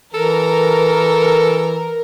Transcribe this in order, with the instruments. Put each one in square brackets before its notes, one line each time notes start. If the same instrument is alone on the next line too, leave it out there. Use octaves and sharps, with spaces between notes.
[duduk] E3 [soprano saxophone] A4 [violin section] A#4